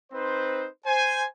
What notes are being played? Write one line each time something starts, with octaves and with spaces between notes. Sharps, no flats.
C4 D#4 B4 C5
C5 G#5